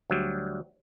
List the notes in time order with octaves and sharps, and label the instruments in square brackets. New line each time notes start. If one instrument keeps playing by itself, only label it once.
[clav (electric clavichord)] D2 F#3 G3